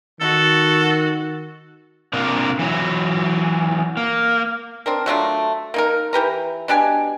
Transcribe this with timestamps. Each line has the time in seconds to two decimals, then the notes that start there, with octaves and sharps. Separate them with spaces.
0.21 D#3 F#4 A4
2.13 C3 A#3 D4 F4 A#4
2.59 E3 F#3
3.97 A#3
4.86 C4 D4 A#4
5.06 F#3 A3 D4 F4
5.74 A#3 D#4 A#4
6.13 E3 G4 B4 A#5
6.68 B2 D4 G4 G#5